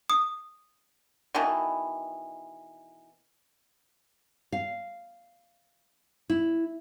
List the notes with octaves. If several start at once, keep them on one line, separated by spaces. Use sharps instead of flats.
D#6
B2 D#3 E3
F5
E4